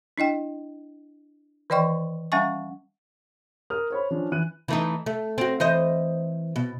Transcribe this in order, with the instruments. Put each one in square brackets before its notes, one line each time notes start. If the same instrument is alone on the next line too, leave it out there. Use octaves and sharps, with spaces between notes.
[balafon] D4 E4 D#5 G5
D#3 E3 D5 D#5 G5 C#6
G3 C#4 E5 F#5 G#5 C#6
[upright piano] A#4 D#6 F6
C5 C#5 B5
F3 C#4 D4
E3 F#6 D#7
[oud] E3 A3 D#4
A3
C4 F#4
E3 C5 D#5
B2